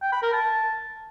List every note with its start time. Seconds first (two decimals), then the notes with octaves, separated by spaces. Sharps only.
0.02 G5
0.12 B5
0.23 A#4
0.33 A5